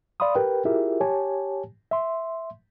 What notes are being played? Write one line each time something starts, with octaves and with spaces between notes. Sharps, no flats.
D5 F5 B5 C6 D#6
G4 A#4 B4 G5
E4 F4 G4 G#4 A#4 E5
G4 C#5 G#5 A5
E5 C6